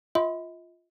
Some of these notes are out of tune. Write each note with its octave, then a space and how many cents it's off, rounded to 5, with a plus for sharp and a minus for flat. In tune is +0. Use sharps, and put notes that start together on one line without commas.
F4 +0 D#5 +45 B5 +20